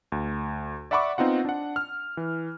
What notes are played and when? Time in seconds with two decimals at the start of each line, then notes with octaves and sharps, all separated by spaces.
0.12 D2
0.91 D5 E5 F#5 B5 C#6 D6
1.18 B3 C4 D#4 F4 F#5
1.45 D4 F#5
1.76 F6
2.17 E3